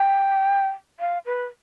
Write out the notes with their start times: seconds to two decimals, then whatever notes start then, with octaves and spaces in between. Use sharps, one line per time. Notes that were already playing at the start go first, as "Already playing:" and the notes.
Already playing: G5
1.00 F5
1.26 B4